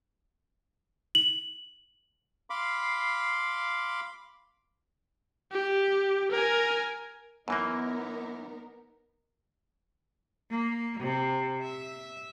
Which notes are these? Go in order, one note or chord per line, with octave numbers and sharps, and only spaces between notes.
F#7
F5 B5 C6 D6
G4
A#4 G#5
F#2 E3 A#3 B3 D#4 A#4
A#3
C3
E5